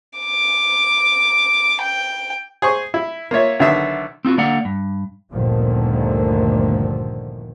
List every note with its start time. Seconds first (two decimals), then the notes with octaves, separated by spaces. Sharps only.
0.19 D6
1.81 G5
2.62 G#4 C5 C#6
2.94 E4
3.31 A#3 F4 C#5 E5
3.59 B1 D3 D#3 E5 E6
4.25 C4 D#4 F4 F#4
4.38 D3 A#3 D5 F5 F#5
4.65 G2
5.32 G1 D2 A#2 D3 D#3 F3